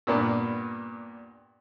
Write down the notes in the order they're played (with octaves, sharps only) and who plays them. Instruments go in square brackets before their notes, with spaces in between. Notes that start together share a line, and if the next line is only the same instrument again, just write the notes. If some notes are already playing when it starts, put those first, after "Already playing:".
[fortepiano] G2 A#2 B3 D4